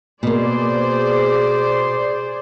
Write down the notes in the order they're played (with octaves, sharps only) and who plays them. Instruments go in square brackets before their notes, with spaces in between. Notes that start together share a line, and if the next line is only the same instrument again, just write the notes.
[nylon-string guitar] B2 A#3 [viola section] G#4 C5 D5